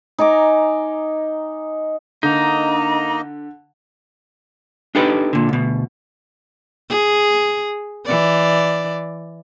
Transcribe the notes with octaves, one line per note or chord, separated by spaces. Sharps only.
D#4 G#5 A#5 D6
D3 A#3 D#4 D#5 A#5
D4 D#4 G4 A4 B4
A#2 D3
D2 B2
G#4
E3 D5